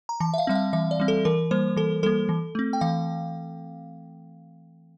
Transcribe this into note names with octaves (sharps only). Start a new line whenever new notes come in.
A#5
E3 A5
E5
F5
G3 C4 E5
F5
E3 E5
D5
G3 C4
A4
E3 A#4
G3 A#3 C5
E3 A4
G3 A#3 A4
E3
A3 C4
G5
E3 F5